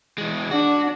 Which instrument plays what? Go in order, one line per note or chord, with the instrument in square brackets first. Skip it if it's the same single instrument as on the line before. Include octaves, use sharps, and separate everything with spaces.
[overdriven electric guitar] E3 G#3
[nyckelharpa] D4 [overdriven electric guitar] F#4